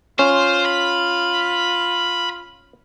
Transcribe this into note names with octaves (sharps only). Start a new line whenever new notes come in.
C#4 F4 C5
B5